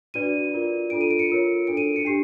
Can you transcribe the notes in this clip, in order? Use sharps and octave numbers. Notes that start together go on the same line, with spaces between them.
D4 F#4 B4 D5 D#7
F4 A#4 D5
D4 F4 A4 D7
D#7
D7
C#7
F4 A#4 C#5
D4 F#4 A4 D7
D#7
C#7
D4 G4 C7